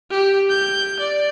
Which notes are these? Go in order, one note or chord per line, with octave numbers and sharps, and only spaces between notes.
G4
G6
D5